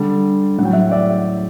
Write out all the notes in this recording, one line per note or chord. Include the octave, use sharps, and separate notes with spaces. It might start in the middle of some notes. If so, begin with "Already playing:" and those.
Already playing: D3 G3
A2 F#3 F#5 G5
E5 F#5
D5 E5